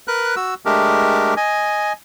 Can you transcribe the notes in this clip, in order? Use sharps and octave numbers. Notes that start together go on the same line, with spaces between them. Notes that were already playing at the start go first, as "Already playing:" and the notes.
A#4 B4 F#6
F#4 E6
G#3 A3 D4 G4 A#4
D#5 G#5